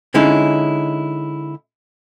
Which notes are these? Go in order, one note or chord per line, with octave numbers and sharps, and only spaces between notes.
D3 G#3 C#4 D#4 E4